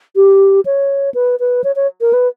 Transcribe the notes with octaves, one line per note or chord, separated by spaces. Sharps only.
G4
C#5
B4
B4
C#5
C#5
A#4
B4